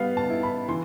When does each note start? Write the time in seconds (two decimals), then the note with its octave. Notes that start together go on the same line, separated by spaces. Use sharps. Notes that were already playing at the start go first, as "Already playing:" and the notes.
Already playing: G3 B3 F5
0.17 A5
0.30 E4
0.43 B5
0.68 E3 C6